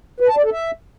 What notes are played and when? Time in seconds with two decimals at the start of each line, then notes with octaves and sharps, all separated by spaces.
0.20 B4
0.28 A5
0.36 D5
0.44 A4
0.52 E5